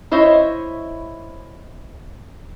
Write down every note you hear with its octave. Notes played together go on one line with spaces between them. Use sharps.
E4 C5 C#5 D#5 E5